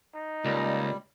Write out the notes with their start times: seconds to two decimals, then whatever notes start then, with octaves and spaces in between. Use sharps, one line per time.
0.15 D#4
0.45 C#2 A#2 G3